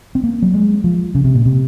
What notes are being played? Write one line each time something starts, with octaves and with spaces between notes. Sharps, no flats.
C4
A#3
F#3
G#3
F3
C#3
C3
A#2
C3